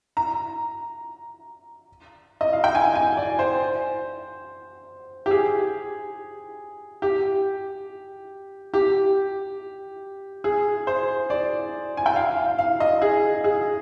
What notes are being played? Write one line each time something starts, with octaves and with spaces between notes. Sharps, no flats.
A#5
D#5
F5
G5
G#5
G#5
D5
C5
G4
G#4
G4
G4
G#4
C5
D5
G#5
G5
F5
F5
F5
D#5
G#4
G#4